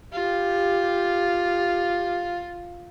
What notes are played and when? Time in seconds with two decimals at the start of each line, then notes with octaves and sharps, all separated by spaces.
0.13 F4 G4